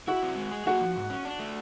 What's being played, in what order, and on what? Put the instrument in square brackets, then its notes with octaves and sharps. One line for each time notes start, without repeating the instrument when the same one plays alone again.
[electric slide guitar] E4 [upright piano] F#4
[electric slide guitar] C4
G#3
G#4
[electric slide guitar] A#3 [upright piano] F#4
[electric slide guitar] F3
G#2
C#4
D4
A3